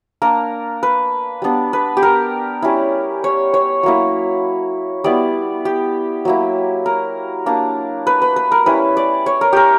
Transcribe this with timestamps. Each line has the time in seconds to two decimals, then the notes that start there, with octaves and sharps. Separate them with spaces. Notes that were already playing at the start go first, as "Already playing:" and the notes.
0.22 A#3 D4 A#4
0.83 B4
1.42 G3 B3 D4
1.73 B4
1.97 G4
2.03 A#4
2.62 G3 C#4 E4
3.24 C#5
3.54 C#5
3.83 F#3 A#3 E4
5.04 G3 B3 E4 D5
5.65 G4
6.25 F#3 A#3 E4
6.86 A#4
7.46 A#3 D4
8.07 B4
8.22 B4
8.36 B4
8.52 A#4
8.66 G3 C#4 E4 B4
8.97 D5
9.26 C#5
9.41 A#4
9.53 G4 A#4